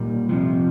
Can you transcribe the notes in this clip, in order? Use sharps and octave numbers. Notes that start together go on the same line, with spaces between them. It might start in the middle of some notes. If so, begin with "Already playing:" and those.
Already playing: A#2 G3
F2 C3 F3